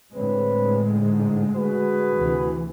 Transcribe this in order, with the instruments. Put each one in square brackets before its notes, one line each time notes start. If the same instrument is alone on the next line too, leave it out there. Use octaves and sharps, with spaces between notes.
[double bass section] A2 D3 G#3 [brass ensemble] C4 B4 C#5
[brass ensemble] G#2
F#4 G#4 B4
[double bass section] D2 C3 E3